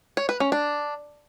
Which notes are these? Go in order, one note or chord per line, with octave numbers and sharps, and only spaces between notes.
C#5
B4
C#4
D4